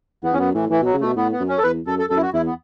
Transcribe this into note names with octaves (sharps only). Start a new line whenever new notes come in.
E2 B3
E2 C#4
F#2 B3
A2 E3
A2 E3
B2
F#3
C#3
B2 A3
A2 B3
B3
F#2
C#4
A4
E2 B4
F#2 A4
A4
F#2 A4
E4
F#4
E2 E4
B3